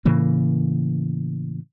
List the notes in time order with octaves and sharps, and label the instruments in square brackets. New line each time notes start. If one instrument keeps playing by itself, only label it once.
[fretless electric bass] A2 C#3 E3 A#3